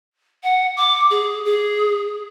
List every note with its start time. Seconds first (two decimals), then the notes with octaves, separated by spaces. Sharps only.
0.43 F#5
0.77 D6
1.10 G#4
1.45 G#4